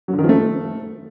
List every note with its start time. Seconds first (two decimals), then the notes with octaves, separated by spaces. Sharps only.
0.08 F#3
0.13 D3
0.19 D#3
0.24 F3
0.29 A3